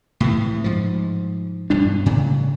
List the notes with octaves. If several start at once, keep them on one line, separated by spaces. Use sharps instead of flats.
A2 C3 E3
G#2 F3
E1 G2 B2 D4
A2 C#3